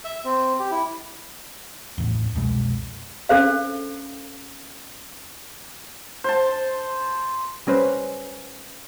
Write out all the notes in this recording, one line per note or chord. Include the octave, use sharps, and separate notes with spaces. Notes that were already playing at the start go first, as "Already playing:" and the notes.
E5
C4
G4
E4
D1 A1 E2
C2 F2 B2 G#3
C#4 D4 A4 C5 F5
C5 A5
G3 C#4 B4 C5